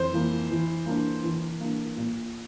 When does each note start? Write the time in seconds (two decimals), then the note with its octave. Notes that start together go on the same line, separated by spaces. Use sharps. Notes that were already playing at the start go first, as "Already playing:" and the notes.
Already playing: F2 E3 C5
0.12 E3 A#3
0.50 E3
0.86 A#3 D4
1.23 E3
1.60 A#3 D4
1.97 A#2